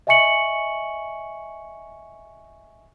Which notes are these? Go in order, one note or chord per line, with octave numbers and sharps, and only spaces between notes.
D#5 E5 G#5 C#6 C#7 F#7